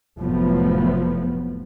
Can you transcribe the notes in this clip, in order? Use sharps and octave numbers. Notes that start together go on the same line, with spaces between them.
F1 A2 F3 F#3 B3